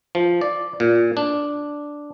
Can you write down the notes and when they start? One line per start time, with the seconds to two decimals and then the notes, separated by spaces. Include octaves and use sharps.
0.15 F3
0.41 D5
0.80 A#2
1.17 D4